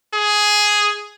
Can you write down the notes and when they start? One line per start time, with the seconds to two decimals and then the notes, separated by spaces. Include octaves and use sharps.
0.14 G#4